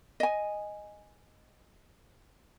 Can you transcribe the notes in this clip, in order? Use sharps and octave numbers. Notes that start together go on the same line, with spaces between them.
D#5 G#5